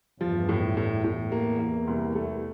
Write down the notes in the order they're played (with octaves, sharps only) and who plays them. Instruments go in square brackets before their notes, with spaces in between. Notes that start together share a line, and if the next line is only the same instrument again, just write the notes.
[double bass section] E2 G2 [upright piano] F3
[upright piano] A2
A2
[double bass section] E2 [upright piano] A2
[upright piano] A#3
[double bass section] E2
[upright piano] A#3
C2
A3